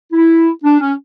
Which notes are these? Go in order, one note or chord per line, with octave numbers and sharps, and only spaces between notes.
E4
D4
C#4